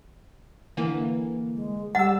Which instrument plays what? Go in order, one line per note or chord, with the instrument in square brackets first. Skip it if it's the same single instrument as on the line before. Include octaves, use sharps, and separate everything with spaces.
[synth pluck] D3 E3 A#3
[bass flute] G#3
[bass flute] G3 [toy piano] F#5 [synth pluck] E6 A6